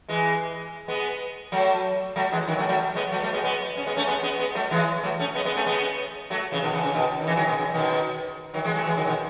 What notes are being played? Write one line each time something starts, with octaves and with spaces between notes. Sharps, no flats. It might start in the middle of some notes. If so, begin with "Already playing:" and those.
E3 G#3
G#3 B3
F#3 A3
F#3 A3
E3 G#3
D#3 F#3
F#3 A3
F#3 A3
G#3 B3
F#3 A3
F#3 A3
G#3 B3
G#3 B3
C#4
G#3 B3
A3 C#4
G#3 B3
G#3 B3
G#3 B3
F#3 A3
E3 G#3
F#3 A3
A3 C#4
G#3 B3
G#3 B3
A3 C#4
G#3 B3
F#3 A3
C#3 E3
B2 D#3
C#3 E3
C#3
B2 D#3
D#3
C#3 E3
D#3 F#3
B2 D#3
C#3
B2 D#3
D#3 F#3
E3 G#3
F#3 A3
E3 G#3
D#3 F#3
B2 D#3